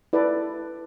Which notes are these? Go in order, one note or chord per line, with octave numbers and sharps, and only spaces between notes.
E4 A4 B4 D5